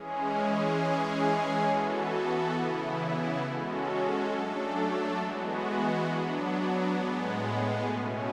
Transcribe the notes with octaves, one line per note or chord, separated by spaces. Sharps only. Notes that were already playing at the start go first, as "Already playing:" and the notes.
Already playing: E3 G#3 C#4 G#4
E3 G#3 C#4 G#4
E3 B3 F#4 A4
C#3 E3 B3 E4
G#3 C#4 F#4 A4
F#3 A3 D4 A4
E3 G#3 B3 F#4
F#3 B3 D4
A2 G#3 B3
B2 A3 C#4